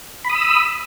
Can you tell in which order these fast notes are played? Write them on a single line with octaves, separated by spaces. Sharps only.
B5 D#6 E6